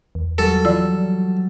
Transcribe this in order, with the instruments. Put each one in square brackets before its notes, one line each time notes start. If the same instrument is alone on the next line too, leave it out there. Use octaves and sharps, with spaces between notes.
[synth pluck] E2
[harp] F#3 G3 [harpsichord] A4
[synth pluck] E3 F3 F4 [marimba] D5 E6